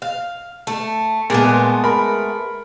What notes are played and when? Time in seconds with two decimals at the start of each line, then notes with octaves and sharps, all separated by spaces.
0.02 F5
0.67 A3
1.30 A#2 G#3 A3 B3
1.84 A#4 B5